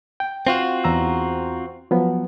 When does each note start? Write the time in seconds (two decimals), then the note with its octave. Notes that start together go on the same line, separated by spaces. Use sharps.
0.20 G5
0.47 C4 F4 F#4
0.84 E2 A#5 E6
1.91 F3 F#3 B3